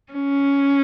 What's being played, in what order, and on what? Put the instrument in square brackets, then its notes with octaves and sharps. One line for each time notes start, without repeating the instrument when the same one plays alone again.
[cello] C#4